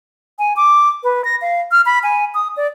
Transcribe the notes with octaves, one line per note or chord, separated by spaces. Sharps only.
G#5
D6
B4
A#6
F5
F6
B5
G#5
D#6
D5